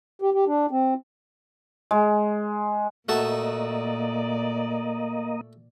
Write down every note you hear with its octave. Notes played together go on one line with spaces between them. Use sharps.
G4
G4
D4
C4
G#3
A#2 A3 A#3 F#4 D5 D#5 A5